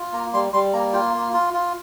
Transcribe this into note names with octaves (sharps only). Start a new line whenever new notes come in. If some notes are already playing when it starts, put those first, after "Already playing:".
Already playing: F4
A#3 A#5
G3 C6
G3 C6
A#3 A#5
F4 G5
A#3
F4
F4